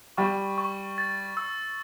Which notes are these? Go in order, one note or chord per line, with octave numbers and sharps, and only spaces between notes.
G3 C#6
C#6
A6
E6